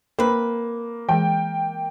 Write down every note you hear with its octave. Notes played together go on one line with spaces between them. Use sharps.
A#3 C4 B4
E3 G#3 G#4 G5